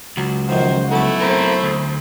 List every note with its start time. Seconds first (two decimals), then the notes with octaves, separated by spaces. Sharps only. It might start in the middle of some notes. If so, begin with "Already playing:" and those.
0.17 C#2 F#3
0.49 F#2 D#3 F3 F#4 C5
0.92 B1 A3 E4 F#5 D6
1.22 C4 A#4 C5
1.63 D2